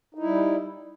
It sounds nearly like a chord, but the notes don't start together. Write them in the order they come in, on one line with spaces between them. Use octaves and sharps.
D#4 E4 G3